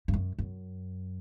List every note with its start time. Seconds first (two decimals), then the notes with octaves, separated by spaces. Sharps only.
0.08 G2
0.14 F#2
0.38 F#2